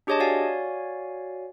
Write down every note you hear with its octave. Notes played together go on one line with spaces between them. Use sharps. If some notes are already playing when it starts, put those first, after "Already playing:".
D4 G4 G#4 C#5 D#5 A5
F#4 C#5 D5 F5 G#5